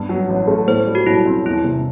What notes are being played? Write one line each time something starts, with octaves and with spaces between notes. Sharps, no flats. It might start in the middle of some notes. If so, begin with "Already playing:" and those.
Already playing: G2 B3
F#3
A1
A3
A2 C5
G3
F#4
B1 E4
C4
E2 E4
C3